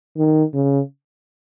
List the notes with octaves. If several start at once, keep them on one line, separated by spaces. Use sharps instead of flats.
D#3
C#3